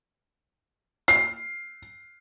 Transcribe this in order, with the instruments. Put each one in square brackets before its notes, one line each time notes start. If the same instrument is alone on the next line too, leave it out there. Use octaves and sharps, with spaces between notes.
[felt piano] C7